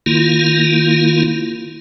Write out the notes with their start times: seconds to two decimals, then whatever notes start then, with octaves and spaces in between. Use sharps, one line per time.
0.06 D#3 A#3 E4 F4